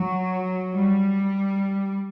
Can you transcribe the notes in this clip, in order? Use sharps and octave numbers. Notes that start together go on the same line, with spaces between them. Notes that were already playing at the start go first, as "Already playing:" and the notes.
Already playing: F#3
G3